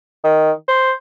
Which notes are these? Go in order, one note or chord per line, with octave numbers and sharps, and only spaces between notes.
D#3
C5